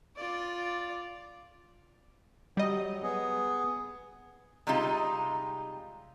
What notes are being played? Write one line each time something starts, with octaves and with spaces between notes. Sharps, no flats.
F4 D5
F#3 G3 D#5
B3 G#4
C3 G3 G#3 D#4 F4